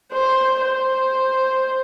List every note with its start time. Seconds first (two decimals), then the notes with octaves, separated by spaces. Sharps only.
0.12 C5
0.61 C5